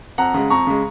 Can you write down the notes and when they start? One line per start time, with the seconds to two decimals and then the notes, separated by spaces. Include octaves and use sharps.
0.18 F2 F#5 A#5
0.34 C#3 G#3
0.50 F2 A#5 C#6
0.67 C#3 G#3